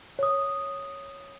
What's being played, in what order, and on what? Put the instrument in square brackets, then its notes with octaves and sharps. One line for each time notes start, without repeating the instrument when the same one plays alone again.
[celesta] C#5 D#6